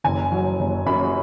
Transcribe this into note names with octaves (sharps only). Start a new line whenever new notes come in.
F#1 G#5
F#3
F#1
F#2 B5